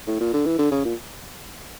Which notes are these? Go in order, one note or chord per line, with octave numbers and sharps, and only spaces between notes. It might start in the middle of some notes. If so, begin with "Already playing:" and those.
A2
A#2
D3
E3
D3
C#3
A#2